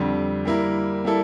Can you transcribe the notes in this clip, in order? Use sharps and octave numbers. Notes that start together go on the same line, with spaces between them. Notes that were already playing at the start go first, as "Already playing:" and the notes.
Already playing: F2 D3 G3
G3 A#3 E4 A#4
G3 A#3 E4 A4